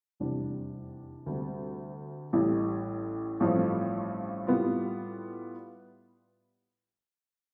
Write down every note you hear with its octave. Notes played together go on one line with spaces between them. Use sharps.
F1 E2 C3 G3 D4
D2 C3 G3
A1 A2 G3
A1 G2 F3 A3 C4
A2 G3 B3 F4